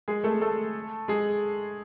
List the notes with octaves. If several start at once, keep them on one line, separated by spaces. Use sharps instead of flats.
G#3 G#4
A3 A4
A3 A4
G#3 G#4